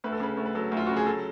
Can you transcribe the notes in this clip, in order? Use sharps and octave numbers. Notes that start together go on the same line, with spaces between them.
D2 B4
A4
C#3 B4
D2
B4
F#3 A4
D2
F4
C#3 F#4
G#4
F#3 A4